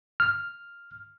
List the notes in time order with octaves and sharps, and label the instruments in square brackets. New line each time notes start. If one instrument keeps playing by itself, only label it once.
[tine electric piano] F6